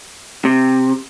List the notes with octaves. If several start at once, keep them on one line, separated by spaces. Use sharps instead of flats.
C3